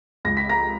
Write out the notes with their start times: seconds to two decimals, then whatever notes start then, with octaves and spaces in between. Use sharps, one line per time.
0.25 C#2 A#6
0.37 B6
0.50 A#5 A#6